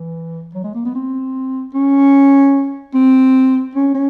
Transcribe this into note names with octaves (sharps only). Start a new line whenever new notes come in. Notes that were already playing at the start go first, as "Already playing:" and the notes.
Already playing: E3
F#3
G#3
A#3
B3
C4
C#4
C4
C#4
C#4